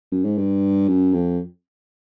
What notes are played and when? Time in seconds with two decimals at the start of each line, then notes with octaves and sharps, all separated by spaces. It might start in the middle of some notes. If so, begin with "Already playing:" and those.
0.12 F#2
0.24 G#2
0.38 G2
0.88 F#2
1.14 F2